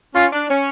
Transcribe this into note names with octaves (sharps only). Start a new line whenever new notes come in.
C#4 F4
D4
C#4